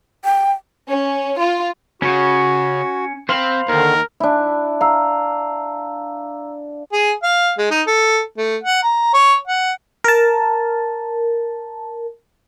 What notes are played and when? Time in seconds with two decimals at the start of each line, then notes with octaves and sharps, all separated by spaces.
0.25 G5
0.88 C#4
1.38 F4
2.02 C#3 C#4 F#4 C#5
3.29 C4 C5 F5 B5
3.69 D#2 D3 D#3 A#4
4.20 D4 E4
4.81 F5 A#5 E6
6.93 G#4
7.23 F5
7.58 G#3
7.71 D#4
7.87 A4
8.38 A3
8.64 F#5
8.83 A#5
9.14 C#5
9.47 F#5
10.04 A#4 A5